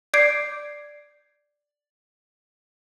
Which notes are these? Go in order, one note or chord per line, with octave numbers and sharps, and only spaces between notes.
D5 D6 G6 G#6 C7 D7